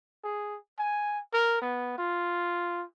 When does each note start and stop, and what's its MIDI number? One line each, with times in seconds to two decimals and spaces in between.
0.24 0.57 68
0.79 1.19 80
1.33 1.61 70
1.61 1.94 59
1.98 2.85 65